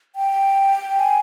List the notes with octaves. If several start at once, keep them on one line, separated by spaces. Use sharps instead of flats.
G5
G#5